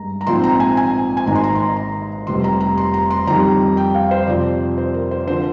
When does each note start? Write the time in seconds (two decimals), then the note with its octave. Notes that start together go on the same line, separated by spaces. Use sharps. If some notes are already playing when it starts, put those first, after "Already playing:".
Already playing: G2 G#3 A#5
0.21 A#5
0.27 A#1 G#2 F3 C4 C6
0.44 A#5
0.60 G#5
0.77 G#5
1.17 G#5
1.27 G#1 G#2 D#3 A#5
1.35 C6
1.44 A#5
1.55 C6
1.60 A#5
1.76 A#5
2.27 F1 F2 C3 G3 C6
2.44 A#5
2.60 A#5
2.78 C6
2.94 A#5
3.10 C6
3.27 F2 D#3 G3 A#5
3.77 G5
3.95 F5
4.11 C5
4.27 F2 C3 F3 D5
4.78 C5
4.94 A#4
5.11 C5
5.28 D3 F3 C5